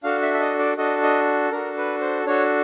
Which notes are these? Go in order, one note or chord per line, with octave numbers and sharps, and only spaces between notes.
D4 F#4 A4 F5
E5
E5
D#5
D5
D4 F#4 A4 D#5
D#5
D4 F#4 A4 A#4
B4
C5
D4 F#4 A4 C#5